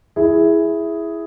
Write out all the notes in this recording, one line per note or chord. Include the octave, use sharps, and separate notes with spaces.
E4 G#4